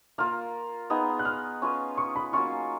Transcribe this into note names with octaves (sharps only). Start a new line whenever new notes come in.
A#3 F4 A#4 F6
B3 D#4 G#4
F#6
F6
C#4 F4 B4
C#6
B5
F#3 A#3 C#4 F4 C#6